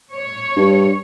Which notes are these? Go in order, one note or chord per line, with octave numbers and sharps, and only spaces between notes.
C#5
G2